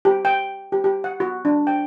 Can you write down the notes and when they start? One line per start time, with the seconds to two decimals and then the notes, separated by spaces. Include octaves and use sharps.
0.05 G4
0.25 G5
0.72 G4
0.84 G4
1.04 F#5
1.20 F#4
1.45 D4
1.67 G5